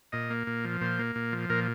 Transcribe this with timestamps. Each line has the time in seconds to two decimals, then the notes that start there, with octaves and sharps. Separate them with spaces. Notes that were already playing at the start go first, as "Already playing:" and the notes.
0.12 A#2 D#5
0.30 A#3
0.47 A#2
0.64 F3
0.81 A#2 C5
0.99 A#3
1.15 A#2
1.32 F3
1.50 A#2 A#4